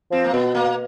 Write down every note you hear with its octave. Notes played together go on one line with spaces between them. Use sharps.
F3 C4
A#3
B2 B3
A#3